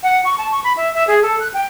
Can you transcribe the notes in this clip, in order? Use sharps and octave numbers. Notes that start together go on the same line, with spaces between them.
F#5
C#6
A5
C#6
B5
E5
E5
G#4
A4
F#6
G5